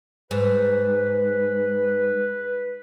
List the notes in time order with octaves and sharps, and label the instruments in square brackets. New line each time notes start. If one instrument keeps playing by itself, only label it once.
[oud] G#2 [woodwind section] B4